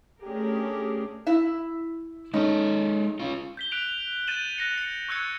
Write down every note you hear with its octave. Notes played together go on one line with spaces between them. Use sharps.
A3 C#4 D4 G4 G#4 A#4
E4 E5
G#3 C#4 D#4 A4
C#4 F4
G6 B6 G7
F#6 D7 F7 F#7
G6 A6 D#7 E7 F#7
F#6 A#6 C#7
F#6 C#7
C#6 E6 F#6 G#6 C#7